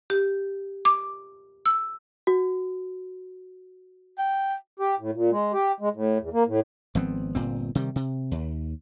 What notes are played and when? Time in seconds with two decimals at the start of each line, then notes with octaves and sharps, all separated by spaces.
0.10 G4
0.85 D6
1.66 E6
2.27 F#4
4.18 G5
4.80 G4
4.99 A2
5.15 A#2
5.31 G#3
5.53 G4
5.80 G#3
5.94 A2
6.21 E2
6.33 A#3
6.47 A2
6.95 G#1 F3 B3 C4
7.35 G1 A#2 C4
7.75 C3 D#3 G3
7.96 C3
8.31 D#2